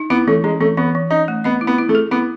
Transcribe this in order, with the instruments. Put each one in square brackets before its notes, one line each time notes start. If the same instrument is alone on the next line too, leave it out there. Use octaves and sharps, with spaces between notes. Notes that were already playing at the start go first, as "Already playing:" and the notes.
Already playing: [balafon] D#4
[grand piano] B3 [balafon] E4
[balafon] E3 [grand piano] A3
[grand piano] G#3 [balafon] C#4
[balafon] E3 [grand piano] A3
[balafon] E3 [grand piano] B3
[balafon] E3
[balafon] C#4 [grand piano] D#4
[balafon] A3
[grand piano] B3 [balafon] D#5
[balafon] E4
[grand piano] B3
[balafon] E4
[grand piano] A3
[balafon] G#4
[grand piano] B3 [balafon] E4